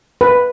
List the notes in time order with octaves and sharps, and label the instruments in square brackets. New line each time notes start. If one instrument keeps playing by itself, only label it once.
[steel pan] B4